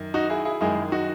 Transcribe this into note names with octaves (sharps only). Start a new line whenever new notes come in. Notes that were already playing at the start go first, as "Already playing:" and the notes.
Already playing: F#2 D#3
D#4 F#4
E4 G#4
E4 G#4
F#2 D#3 G#3 E4 G#4
D#4 F#4